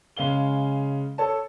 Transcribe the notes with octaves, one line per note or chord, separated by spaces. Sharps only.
C#3 G#3 F5 G7
A4 C#5 A5